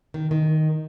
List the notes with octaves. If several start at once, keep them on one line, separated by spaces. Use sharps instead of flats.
D#3
D#3